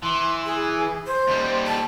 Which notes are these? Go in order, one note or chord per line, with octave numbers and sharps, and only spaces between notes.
E3 C6
G#4
C5
D#2 G3
A5